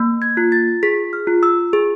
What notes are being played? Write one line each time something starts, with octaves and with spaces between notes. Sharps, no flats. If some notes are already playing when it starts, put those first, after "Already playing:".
Already playing: A#3
G#6
F4
A6
G#4 B6
F6
F4
E6
G#4